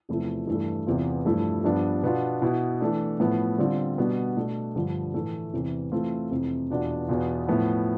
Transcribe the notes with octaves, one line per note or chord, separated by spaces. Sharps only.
E2 C3 F3 A3 E4
G2 E3 A3
E2 C3 E3 B3 F4
G2 F3 A3 E4
G2 F3 B3 D4
B2 B3 D4 F4
B2 B3 E4
E3 A3 D4
A2 F3 B3 E4
D3 G3 C4 F4
B2 G3 B3 D4
B2 A3 D4
G2 D3 F3
A2 E3 A3
E2 C3 E3
E3 A3 C4 F4
F2 C3 E3
E2 B2 B3 D4 F4
E2 B2 B3 F4
A2 F3 B3 E4